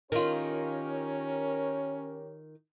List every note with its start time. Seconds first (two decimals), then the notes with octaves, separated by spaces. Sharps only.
0.12 D#3 C#4 F4 G4 A#4 C#5